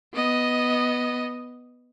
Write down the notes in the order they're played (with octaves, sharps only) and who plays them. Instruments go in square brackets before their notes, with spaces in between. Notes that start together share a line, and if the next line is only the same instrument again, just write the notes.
[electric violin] B3 D#5